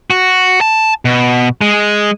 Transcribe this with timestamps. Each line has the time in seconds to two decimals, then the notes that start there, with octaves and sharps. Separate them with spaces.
0.10 F#4
0.61 A5
1.05 B2
1.61 G#3